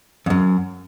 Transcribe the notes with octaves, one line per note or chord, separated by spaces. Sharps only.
F2
F#2